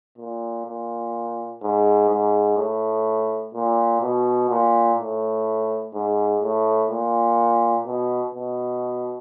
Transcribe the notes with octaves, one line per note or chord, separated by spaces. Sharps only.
A#2
A#2
G#2
G#2
A2
A#2
B2
A#2
A2
G#2
A2
A#2
B2
B2